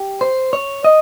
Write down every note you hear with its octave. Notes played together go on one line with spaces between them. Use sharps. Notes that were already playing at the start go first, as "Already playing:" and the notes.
Already playing: G4
C5
C#5
D#5